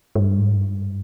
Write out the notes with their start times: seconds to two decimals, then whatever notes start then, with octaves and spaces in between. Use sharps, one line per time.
0.15 G#2
0.20 G2
0.38 G#2
0.56 G2